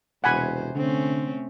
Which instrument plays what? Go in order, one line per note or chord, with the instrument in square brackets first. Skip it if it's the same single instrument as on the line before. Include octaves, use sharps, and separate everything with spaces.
[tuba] E1 [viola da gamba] C3 C5 [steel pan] F#5 G#5 B5
[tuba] D3 [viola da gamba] A3 C4 C#4